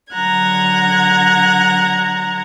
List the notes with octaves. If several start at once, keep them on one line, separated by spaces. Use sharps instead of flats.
D3 F#3 F#5 A#5 F#6 G#6